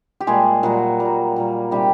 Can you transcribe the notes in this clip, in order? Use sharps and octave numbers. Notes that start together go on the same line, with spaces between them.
G4
A#2 G3 G#3 A#3 G#4
A#2 F#3 G3 A#3 F#4
A#2 G3 A#3
A#2 G3 A#3
C3 D#3 G3 G#3 G4